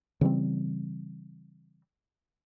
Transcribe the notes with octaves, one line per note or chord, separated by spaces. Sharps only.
C#3 E3 G3 C4